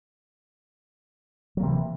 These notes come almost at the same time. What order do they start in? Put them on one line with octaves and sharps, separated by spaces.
F#3 A#3 C3 E3